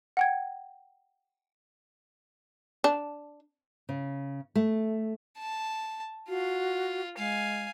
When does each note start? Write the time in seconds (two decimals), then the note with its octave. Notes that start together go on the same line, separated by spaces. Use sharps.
0.17 F#5 G5 G#6
2.84 D4
3.89 C#3
4.55 A3
5.39 A5
6.29 F4 F#4
7.18 G#3 F5 G#5